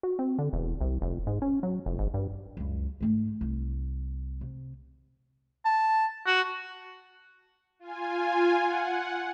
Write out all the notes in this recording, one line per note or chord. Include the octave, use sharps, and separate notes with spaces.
F#4
C4
D3
E1
C2
F1
G#2
C#4
F#3
F1
G#1
G2
C#2 F#2
G#2 A3
C2
C3
A5
F#4
F4 G#5
F#5